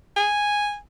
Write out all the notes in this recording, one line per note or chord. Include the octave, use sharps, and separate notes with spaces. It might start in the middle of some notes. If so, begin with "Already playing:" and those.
G#5